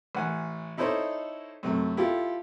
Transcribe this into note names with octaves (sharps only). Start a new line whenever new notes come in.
A1 F#5 G#5
D#4 E4 A4 C5 C#5 D#5
F#2 C3 A3
E4 F4 G4 A4